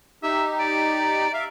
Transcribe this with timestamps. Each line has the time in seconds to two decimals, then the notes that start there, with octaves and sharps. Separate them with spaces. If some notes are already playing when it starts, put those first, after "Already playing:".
0.23 D#4 G4 E5
0.59 D5
1.34 E5 F5